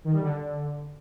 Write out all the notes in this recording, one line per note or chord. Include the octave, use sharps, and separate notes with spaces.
D#3
G3
D3